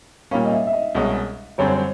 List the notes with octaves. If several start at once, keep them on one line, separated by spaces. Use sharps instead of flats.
A#2 G3 A#3 C#4 F5
D#5
E5
E5
D#5
C2 B2 G#3 C#4
F#2 D3 G3 C4 C#5
C5
C#5